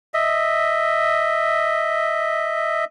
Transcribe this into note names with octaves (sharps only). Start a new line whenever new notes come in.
D#5 E5